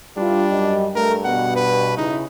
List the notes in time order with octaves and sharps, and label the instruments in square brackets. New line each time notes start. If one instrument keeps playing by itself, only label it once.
[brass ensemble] G2 E4 F4 [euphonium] G3 [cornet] D4
[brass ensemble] F#2 D#5
[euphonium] G2 [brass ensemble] A3 [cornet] A#4
[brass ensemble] B2 [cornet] F#5
[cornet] B4
[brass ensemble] C#3 E4 [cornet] D#4